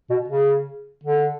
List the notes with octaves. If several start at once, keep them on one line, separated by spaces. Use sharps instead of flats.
B2
C#3
D3